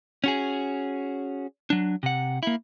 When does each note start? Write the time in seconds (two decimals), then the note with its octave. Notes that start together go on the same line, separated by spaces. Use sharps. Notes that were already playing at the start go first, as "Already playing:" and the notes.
0.24 C#4 F#4 G#4
1.70 F#3 D4
2.03 C3 F#5
2.43 A#3 E4